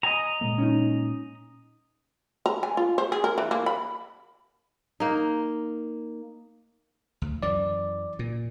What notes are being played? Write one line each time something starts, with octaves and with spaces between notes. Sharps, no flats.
D#5 G#5 A#5
A#2 G#3 A#3
C#4 D#4
A#5
G#5
F4
C5
G#4
A#4
E3
A#3
B5
A#3 D#4
D2
F#2 E3 D5
A#2